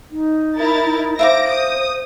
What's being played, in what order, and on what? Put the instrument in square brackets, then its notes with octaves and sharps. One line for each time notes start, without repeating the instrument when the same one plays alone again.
[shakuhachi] D#4
[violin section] E4 A#4 A6
[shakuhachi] C5 [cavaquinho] E5 F5 D6 [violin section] A#6 D7
[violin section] D#6